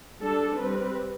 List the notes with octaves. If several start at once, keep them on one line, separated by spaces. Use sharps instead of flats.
G3 D4 A4
G3 C4 B4